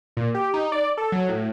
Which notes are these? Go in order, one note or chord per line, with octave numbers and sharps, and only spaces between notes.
A#2
G4
D#4
D5
A4
F#3
A2